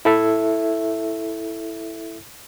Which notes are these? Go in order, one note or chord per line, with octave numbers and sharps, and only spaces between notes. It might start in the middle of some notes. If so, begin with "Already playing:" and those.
E4 A4 E5